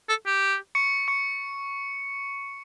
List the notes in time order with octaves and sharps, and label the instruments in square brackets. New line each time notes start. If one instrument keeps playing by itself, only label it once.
[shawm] A4
G4
[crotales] C#6 C#7
C#6 C#7